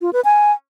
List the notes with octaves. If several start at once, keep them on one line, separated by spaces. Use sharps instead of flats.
F4
B4
G#5